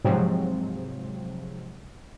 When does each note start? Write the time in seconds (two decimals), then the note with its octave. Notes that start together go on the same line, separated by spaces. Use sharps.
0.05 G#2 C3 F3 F#3 C4